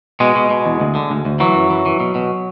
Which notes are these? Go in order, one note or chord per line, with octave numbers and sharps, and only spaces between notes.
B2 G#3
B2
B2
E2
D2
D3
D2
D2
E3 F#3
F#2
E3
E3
B2
B2